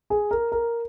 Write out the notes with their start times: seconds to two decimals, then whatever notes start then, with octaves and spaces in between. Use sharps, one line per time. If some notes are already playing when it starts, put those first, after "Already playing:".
0.10 G#4
0.31 A#4
0.52 A#4